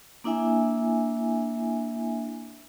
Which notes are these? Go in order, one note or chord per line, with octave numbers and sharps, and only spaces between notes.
A#3 D4 E4 E5 G#5